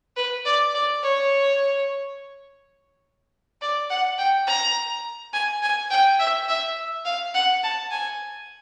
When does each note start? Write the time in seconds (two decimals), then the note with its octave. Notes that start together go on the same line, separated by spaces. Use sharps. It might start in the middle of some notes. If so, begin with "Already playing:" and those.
0.16 B4
0.46 D5
0.75 D5
1.03 C#5
3.61 D5
3.90 F#5
4.18 G5
4.47 A#5
5.33 G#5
5.63 G#5
5.91 G5
6.19 E5
6.48 E5
7.05 F5
7.34 F#5
7.63 A5
7.91 G#5